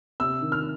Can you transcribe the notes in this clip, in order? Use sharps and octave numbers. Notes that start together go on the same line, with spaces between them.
C3 E6
D#3
F6